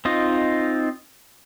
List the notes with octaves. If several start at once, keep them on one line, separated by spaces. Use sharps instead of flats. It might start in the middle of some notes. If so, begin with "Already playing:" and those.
C4 D#4 F4 D#5